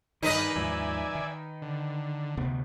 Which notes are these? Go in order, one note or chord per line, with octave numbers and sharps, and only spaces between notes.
G2 D#3 D#4 G#4 A#4 B4 D5 D#5
D#2 G#2 F3 D5 E5 G#5
D#3
D3
D2 C3 B3